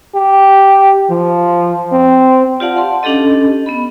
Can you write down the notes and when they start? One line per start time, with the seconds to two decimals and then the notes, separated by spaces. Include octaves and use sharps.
0.15 G4
1.10 F3
1.93 C4
2.60 F4 G4 D5 F5 F#5 A5
2.76 F#5 A5 C6
3.03 C#4 D4 G4 A4 D#5
3.66 B3 D#5 B5